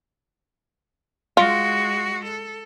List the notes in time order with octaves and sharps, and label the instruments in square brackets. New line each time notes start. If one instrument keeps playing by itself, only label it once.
[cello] G#3 F#4 [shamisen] F4
[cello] A4